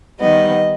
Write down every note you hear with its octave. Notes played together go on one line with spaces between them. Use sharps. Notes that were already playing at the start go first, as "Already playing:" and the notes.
D#3 G3 B3 D#5